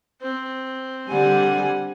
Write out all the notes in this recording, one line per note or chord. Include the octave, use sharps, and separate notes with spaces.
C4
D3 G3 F#5 G#5